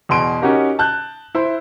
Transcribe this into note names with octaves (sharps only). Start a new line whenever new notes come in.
E2 B2 C6 D7
C#4 D#4 F#4 G4 A#4
A5 F#6 G6
E4 C5